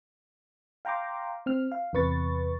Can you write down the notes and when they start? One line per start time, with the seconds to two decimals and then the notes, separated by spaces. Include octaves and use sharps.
0.85 F5 G5 A#5 C6 D6
1.46 C4 F6
1.72 F5
1.93 E2 C3 B4 C#6 A6